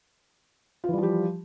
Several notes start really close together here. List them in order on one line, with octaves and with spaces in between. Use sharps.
F4 E3 G3 F3 G4